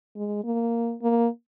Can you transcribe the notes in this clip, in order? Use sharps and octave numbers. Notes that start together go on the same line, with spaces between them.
G#3
A#3
A#3